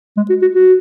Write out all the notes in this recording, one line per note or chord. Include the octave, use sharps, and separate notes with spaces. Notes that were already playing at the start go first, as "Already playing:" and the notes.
G#3
F#4
F#4
F#4